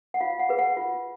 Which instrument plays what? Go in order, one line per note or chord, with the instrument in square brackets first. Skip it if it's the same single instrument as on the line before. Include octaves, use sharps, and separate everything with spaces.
[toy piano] F#5
F4 F5
F#5
G#4 B4
F#5
F4